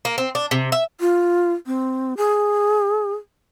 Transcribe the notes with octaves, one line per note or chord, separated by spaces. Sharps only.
A#3
C4
D4
C3
E5
F4
C4
G#4